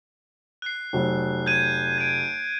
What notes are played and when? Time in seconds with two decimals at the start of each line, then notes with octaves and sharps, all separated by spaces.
0.62 F#6 C7
0.93 F1 F#3
1.46 G6 G#6 D#7
1.98 G#6 D7